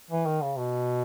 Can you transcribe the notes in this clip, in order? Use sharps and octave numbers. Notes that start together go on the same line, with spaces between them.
E3
D#3
C#3
B2